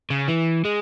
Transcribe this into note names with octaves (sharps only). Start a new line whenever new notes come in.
C#3
E3
G#3